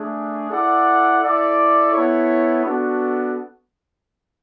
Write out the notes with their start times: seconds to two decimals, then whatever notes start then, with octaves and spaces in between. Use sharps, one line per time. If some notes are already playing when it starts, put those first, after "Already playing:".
Already playing: A3 D4 G#4
0.51 E4 A4 D5 F#5
1.22 E4 A4 D5
1.92 B3 E4 A4 C#5
2.64 B3 D4 F#4 A4